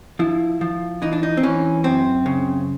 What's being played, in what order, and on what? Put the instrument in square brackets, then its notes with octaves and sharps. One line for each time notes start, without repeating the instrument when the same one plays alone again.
[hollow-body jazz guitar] F3 E4
F3
E3 D#4
D4
D#4
C4
E3 C#4
F#2 C4
C#3